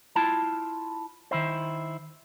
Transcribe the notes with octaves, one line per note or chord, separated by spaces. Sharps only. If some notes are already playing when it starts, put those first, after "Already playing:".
E4 F4 A5
D#3 E4 C5